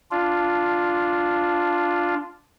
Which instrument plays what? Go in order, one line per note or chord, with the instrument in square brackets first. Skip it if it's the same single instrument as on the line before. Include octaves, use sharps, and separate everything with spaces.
[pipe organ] D4 F4